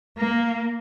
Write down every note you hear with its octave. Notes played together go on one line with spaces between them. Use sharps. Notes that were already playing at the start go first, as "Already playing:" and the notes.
A#3